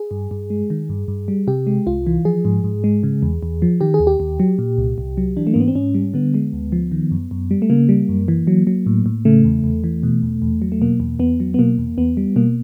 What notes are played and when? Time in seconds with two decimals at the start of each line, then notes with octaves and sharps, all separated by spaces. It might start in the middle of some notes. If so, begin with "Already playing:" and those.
Already playing: G#4
0.11 G2
0.31 G2
0.50 G#3
0.70 D#3
0.89 G2
1.08 G2
1.28 G3
1.47 C3 G4
1.67 G#3
1.87 C2 F4
2.07 E3
2.25 F3 G#4
2.45 G#2
2.64 G#2
2.84 G#3
3.03 C#3
3.23 E2
3.43 E2
3.62 F3
3.81 D#3 G4
3.94 G#4
4.00 D#2
4.07 G4
4.20 D#2
4.40 F#3
4.59 A#2
4.78 C2
4.98 C2
5.17 F#3
5.37 E3 D4
5.47 A3
5.54 G#2 A#3
5.60 B3
5.68 C4
5.75 G#2 C#4
5.95 G3
6.14 D3 B3
6.34 G#3
6.53 D2
6.72 F3
6.92 D#3
7.11 F#2
7.31 F#2
7.51 G3
7.62 A3
7.70 C#3 A#3
7.89 G3
8.09 F#2
8.28 E3
8.47 F#3
8.67 F#3
8.86 A2
9.06 A2
9.25 C#3 A3
9.45 E2
9.64 E2
9.84 E3
10.03 B2
10.23 E2
10.42 E2
10.62 F#3
10.72 A3
10.82 B2 A#3
11.00 E2
11.19 E2 B3
11.40 F#3
11.54 B3
11.59 B2 A#3
11.78 E2
11.98 E2 B3
12.17 G3
12.36 B2 A#3